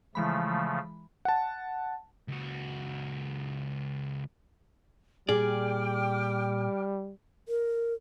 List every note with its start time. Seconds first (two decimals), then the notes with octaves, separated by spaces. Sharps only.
0.15 C#3 E3 F3 G#3 A3 B5
1.25 F#5 A5
2.28 C#2 F#4
5.29 A#2 G3 G#4 D5 G5 D6 F6
7.49 A#4